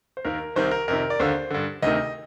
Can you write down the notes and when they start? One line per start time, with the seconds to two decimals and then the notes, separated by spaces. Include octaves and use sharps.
0.17 C5
0.25 D#2 D#3 A#4
0.56 C2 C3 D#3 C5
0.71 A#4
0.88 F2 C3 D#3 A#4
1.10 D5
1.20 D#2 D3 C5
1.50 G2 D3
1.82 D2 C3 D#3 D#5